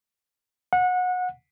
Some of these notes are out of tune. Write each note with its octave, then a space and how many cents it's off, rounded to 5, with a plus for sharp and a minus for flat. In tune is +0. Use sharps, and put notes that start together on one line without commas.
F#5 -25